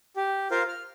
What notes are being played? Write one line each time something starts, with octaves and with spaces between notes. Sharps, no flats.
G4
F4 A#4 C5 F5
F6